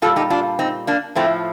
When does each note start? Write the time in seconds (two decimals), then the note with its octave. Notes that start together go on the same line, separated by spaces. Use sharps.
0.02 A#2 G3 F4 A4
0.16 D#4 G4
0.30 D4 F4
0.59 C4 D#4
0.87 A#3 D4
1.15 A2 F3 A3 C4